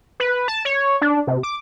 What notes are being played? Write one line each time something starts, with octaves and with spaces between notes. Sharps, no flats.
B4
A5
C#5
D4
C3
D6